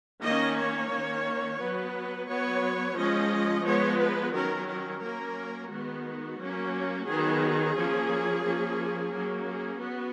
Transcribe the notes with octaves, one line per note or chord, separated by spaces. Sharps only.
D#3 A#3 C#4 D#5
C#5
D#3 A#3 C#4
F#3 B3 B4
F#3 B3 C#5
F3 G#3 C#4 D#5
F3 G#3 B3 C#5
B4
D#3 F#3 C#4 A#4
A#4
F#3 A#3 C#4 A#4
D#3 G#3 B3 F#4
F#3 A#3 C#4
D#3 F#3 B3 G#4
F3 A#3 C#4
F3 A#3 C#4
F#3 A#3 C#4
G#4
B3 F#4